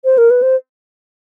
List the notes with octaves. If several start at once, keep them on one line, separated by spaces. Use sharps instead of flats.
C5
A#4
B4
C5